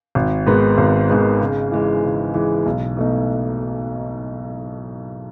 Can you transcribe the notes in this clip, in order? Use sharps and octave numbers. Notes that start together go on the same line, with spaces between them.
G#1
G#2 D#3 G#3 B3
G#1
G#2 D#3 G#3 B3
C#3
E3 G#3
C#3
E3 G#3
B1
B2 A3 D#4